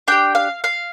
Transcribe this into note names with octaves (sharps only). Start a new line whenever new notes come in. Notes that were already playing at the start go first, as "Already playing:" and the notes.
D4 G4 G5
F5
F5